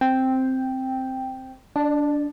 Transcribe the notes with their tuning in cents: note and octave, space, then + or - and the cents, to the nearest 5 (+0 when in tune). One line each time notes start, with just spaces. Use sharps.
C4 +0 G5 +0
D4 -15 D5 +35 A5 +0